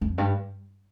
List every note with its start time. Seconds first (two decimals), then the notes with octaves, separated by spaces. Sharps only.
0.01 F2
0.18 G2